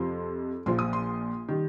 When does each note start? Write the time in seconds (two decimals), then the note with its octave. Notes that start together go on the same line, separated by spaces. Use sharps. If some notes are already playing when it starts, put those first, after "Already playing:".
Already playing: F2 C3 F3 C6
0.66 A#1 A#2 F3 C6
0.79 D#6
0.93 C6
1.48 D#3 G3